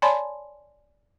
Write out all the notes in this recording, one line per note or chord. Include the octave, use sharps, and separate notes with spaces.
C#5 D5 G#5 A5 B5 C6